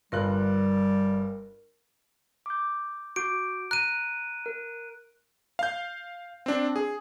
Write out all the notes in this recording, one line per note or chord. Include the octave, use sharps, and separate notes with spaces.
G1 G3 F4 A#4 F#6
D6 G6
F#4 D6 G6 D7
A#5 F#6 D#7
A#4
F5 G6
C4 D4
G#4